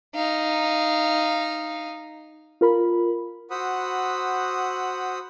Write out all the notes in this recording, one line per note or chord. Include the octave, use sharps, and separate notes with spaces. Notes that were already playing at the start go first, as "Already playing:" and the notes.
D#4 F5
F4 A#4 B5
F#4 C5 F#5 B5 D#6 E6